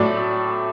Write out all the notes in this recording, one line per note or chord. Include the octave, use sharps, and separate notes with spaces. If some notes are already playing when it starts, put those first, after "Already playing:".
Already playing: A2 F#3 A3 D5